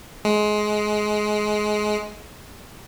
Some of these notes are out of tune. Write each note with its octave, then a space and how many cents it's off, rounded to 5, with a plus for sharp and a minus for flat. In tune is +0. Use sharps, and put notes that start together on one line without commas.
G#3 +20